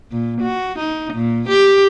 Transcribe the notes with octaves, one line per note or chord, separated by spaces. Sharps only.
A#2
F#4
D#4
A#2
G4